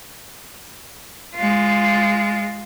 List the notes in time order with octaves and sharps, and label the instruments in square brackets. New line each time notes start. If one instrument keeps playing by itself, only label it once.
[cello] G#3 F4